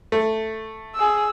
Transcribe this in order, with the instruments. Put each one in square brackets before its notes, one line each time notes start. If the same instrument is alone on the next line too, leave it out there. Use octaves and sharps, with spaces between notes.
[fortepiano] A3
[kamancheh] G#4 E6